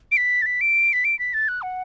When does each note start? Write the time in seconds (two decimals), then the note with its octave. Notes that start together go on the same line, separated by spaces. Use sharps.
0.12 D7
0.17 B6
0.42 A6
0.46 B6
0.61 D7
0.93 B6
1.04 D7
1.19 B6
1.34 A6
1.48 F#6
1.62 F#5